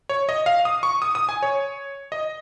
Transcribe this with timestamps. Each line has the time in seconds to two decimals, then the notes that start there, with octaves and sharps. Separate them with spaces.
0.09 C#5
0.29 D#5
0.46 F5
0.65 D#6
0.83 C#6
1.02 D#6
1.15 D#6
1.29 G#5
1.43 C#5
2.12 D#5